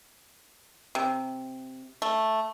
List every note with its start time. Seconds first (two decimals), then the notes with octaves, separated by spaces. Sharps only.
0.95 C3
2.02 A3